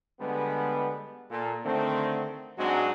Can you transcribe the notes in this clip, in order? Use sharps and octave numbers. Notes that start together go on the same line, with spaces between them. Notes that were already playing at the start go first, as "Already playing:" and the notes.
D3 G3 G#3 B3
A#2 A4
D3 D#3 A3 C4
G#2 F#3 G#3 C4 D4 F#4